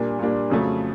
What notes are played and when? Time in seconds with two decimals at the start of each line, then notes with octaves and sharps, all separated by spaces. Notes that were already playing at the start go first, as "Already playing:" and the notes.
Already playing: A#2 G3 A#3 D4
0.19 A#2 G3 A#3 D4
0.50 F2 C#3 F#3 A3